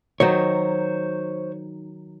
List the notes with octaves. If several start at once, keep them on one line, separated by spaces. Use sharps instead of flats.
D#3 F#3 D#4 C5 C#5